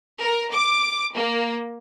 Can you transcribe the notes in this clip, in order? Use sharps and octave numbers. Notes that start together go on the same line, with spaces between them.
A#4
D6
A#3